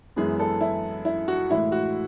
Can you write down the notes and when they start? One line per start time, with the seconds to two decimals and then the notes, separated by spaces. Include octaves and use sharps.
0.16 F#2 E3 G#3 B3 G#4
0.39 A4
0.61 E4
1.05 E4
1.28 F#4
1.50 A2 E3 G#3 E4
1.72 F#4